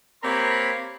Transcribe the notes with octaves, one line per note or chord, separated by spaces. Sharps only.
A#3 C4 G4 A#4 C#5 B5